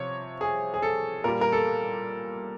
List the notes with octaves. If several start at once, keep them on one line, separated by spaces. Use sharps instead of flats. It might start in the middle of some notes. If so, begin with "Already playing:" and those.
Already playing: C3 F3 C#5
G#4
G#4
A4
A#2 G3 A#4
A#4
A4